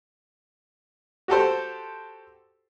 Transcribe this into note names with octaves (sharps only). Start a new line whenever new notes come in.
F#4 G4 A4 C5